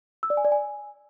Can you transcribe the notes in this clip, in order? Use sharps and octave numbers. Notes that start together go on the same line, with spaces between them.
E6
D5
G#5
D5
G#5